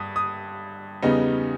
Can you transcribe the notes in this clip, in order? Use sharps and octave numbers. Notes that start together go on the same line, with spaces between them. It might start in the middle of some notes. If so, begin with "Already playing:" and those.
Already playing: G2 D#6
D#6
E2 C#3 G3 B3 D#4